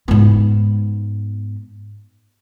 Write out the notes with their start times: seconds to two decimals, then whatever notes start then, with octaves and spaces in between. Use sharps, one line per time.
0.08 G#2 B3